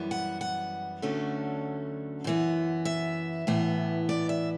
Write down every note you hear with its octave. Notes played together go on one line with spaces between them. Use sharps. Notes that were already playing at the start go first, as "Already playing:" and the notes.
Already playing: F#2 E3 G3 B3
F#5
F#5
D2 D3 F#3 A3 C#4
F#2 E3 B3
E5
A2 E3 B3
D5
E5